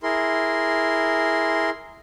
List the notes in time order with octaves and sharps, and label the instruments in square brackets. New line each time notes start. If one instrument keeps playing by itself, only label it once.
[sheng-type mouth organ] E4 G#4 A#4 C6